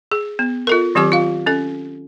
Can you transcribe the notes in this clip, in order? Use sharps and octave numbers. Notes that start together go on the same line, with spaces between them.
G#4
B3
F4 A4 A#4
D#3 F#3 C4 G4 D6
F4 F5
C#4 A4